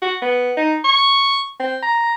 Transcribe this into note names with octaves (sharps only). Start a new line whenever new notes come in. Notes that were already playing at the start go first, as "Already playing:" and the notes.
F#4
B3
D#4
C#6
C4
A#5